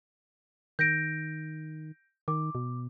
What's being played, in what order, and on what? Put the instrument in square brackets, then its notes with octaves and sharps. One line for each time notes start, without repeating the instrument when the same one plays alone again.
[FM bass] D#3 [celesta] G6 A#6 D7
[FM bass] D#3 [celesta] D6
[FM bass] B2